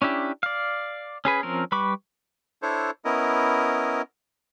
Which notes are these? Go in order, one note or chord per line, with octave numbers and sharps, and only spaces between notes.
C#4 D4 E4 G4
D5 F5
C#4 G#4 B4
F3 C4 C#4 A#4
G3 B4 B5 C#6 D6
D4 E4 A4 C5 C#5
B3 C#4 E4 A#4 D#5